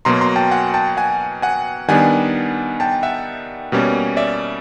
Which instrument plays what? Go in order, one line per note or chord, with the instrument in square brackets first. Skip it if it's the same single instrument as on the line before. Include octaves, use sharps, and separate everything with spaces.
[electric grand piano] B2 F#3 A#3 A#5 C6
A#5 C6
G5 A5
F#5 G#5
G5 A5
F#5 G#5
F#5 G#5
D#3 G3 B3 D4 F#5 G#5
G5 A5
E5 F#5
B2 G3 A#3 C#4
D5 E5